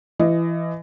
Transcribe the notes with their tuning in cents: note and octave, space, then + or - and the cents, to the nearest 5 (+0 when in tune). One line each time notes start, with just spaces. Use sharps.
E3 +25 D#5 +0